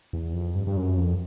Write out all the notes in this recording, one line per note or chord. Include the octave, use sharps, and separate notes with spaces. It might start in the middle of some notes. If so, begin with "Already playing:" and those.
E2
F2
G2
G2
F#2
F2